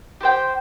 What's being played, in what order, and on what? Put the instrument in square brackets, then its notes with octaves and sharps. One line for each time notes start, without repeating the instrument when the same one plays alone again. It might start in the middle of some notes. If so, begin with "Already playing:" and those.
[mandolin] G4 C5 G5